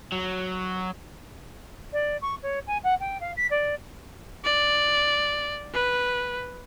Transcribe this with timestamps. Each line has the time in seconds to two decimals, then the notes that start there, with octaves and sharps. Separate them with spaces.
0.12 F#3
1.93 D5
2.22 C#6
2.43 C#5
2.67 G#5
2.84 F#5
3.00 G5
3.20 F5
3.37 B6
3.51 D5
4.44 D5
5.74 B4